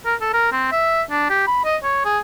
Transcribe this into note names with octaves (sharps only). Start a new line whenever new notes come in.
A#4
A4
A#4
C4
E5
D4
G4
B5
D#5
C#5
G#4